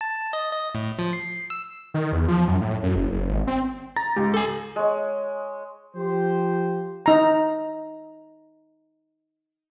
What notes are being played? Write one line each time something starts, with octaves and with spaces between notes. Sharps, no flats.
A5
D#5
D#5
A2
F3
C7
E6
D#3
E2
F3
F#2
A2
F#2
F#1
F#1
G#1
C4
A#5 A6 A#6
C#2 G#2 G4
A4 G#5
G#3 C#5
F3 G4 C5
D#4 A#5